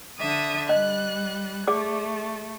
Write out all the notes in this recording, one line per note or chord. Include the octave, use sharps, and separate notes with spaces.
D3 E5 D#6
G3 D#5 F#6
A3 G#4 D5 D6